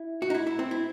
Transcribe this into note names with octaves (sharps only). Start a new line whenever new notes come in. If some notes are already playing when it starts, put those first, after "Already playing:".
Already playing: E4
F#4
D#4
E4
E4
C4
E4